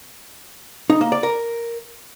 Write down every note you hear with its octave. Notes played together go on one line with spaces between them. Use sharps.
D#4
A#3
D5
A#4